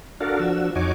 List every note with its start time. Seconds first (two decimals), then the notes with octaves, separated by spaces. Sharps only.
0.21 D4 F#4 A4 A#4 F5
0.40 F3 D4 F#4 E6
0.75 F2 D#4 F#4 C#5 G#5 D6